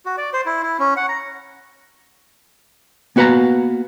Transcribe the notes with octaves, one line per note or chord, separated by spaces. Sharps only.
F#4
D5
C5
E4
E4
C#4
F#5
A#5
A#3 B3 F#4 B4 F5 A#5